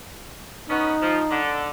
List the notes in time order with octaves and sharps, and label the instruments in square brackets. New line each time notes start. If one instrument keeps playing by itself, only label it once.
[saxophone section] B3 C#4 [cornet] D#4
[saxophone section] F3
D3